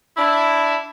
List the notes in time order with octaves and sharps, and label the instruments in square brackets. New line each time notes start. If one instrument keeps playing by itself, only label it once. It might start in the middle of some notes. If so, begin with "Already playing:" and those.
[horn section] D4 E4